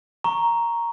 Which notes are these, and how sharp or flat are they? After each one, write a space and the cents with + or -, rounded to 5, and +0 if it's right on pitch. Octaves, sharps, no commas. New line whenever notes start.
A#5 +0 C#6 +0